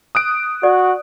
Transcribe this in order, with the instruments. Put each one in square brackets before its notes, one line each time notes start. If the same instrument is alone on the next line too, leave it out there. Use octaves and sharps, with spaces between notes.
[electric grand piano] D#6 F#6 D7
[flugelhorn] F#4 [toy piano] D5